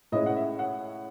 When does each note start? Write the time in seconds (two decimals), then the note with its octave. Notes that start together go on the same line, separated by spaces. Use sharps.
0.12 A2 G#3 C#4 E4 D#5
0.26 F#5
0.36 E5
0.59 F#5